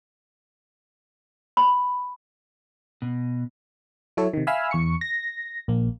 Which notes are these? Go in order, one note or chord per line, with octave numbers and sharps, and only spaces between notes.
B5
B2
F#3 E4 A4 C#5
C3 D#3
E5 F5 G#5 B5 E6 F6
E2 C#6 C#7
A#6
A#1 A#3